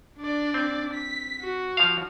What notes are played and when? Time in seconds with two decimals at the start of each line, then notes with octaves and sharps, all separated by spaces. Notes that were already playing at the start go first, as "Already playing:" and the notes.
0.19 D4 D5
0.54 C4
0.94 B6
1.41 F#4
1.77 F3 F5